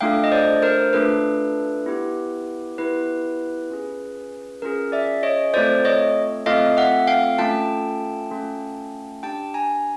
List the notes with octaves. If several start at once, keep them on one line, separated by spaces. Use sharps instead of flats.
A3 D4 F4 A4 F5 G5
D#5
C5 D5
A#4 C5
A3 D4 F4 A4 B4
B3 E4 G4
B3 E4 G4 B4
C#4 F4 G#4
C#4 F4 G#4 A#4
D5 E5
C#5 D#5
A3 C4 F4 A4 C5 D5
C#5 D#5
A3 C4 F4 A4 D#5 F5
E5 F#5
F5 G5
A3 C#4 F4 A4 G5 A5
A3 C#4 F4 A4
D4 G4 G5 A5
G#5 A#5